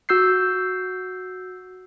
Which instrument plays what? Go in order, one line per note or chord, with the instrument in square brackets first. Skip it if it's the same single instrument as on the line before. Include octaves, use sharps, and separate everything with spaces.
[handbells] F#4 E6 G6 C7